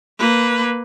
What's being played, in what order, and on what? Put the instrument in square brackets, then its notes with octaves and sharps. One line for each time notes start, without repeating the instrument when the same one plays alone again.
[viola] A#3 B4